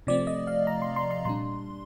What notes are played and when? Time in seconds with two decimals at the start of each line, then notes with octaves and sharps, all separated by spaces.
0.07 C3 F3 A3 C4 D5
0.27 D#5
0.47 F5
0.67 A#5
0.82 C6
0.96 C6
1.11 C6
1.25 A#2 G3 D4 C6